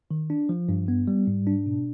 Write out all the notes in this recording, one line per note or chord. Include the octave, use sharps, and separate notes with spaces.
D#3
D4
F3
G2
B3
G3
G#2
D4
B2